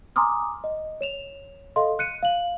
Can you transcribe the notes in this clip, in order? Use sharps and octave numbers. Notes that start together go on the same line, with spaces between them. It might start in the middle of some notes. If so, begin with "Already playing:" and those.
G#5 A#5 C6 D6 D#6 F6
D#5
C#5 E7 F7
A4 D#5 F5 C6
F#6 C#7 D#7
F5 F#7